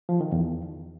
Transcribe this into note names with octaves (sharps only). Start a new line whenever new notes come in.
F3
D#3
E2